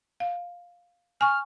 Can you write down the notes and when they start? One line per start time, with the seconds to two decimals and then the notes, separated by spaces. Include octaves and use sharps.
0.20 F5
1.21 G#5 C#6 F6